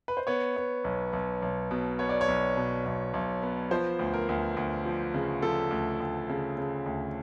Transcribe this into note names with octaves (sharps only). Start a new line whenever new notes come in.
B4
C5
B3 C#5
B3
B1
B1
B1
B2
B3 C#5
D5
C#5
B1
B2
B1
B1
B3
F3 C5
D2
A#4
D2
D2
F3
C#3
F3 A4
D2
D2
C#3
C#3
D2